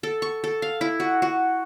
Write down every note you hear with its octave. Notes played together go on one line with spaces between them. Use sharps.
A4
C#6
A4
F5
E4
F#4
F#4